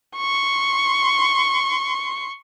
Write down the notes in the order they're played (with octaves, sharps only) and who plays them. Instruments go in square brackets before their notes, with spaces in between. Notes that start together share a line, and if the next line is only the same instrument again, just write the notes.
[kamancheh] C6 C#6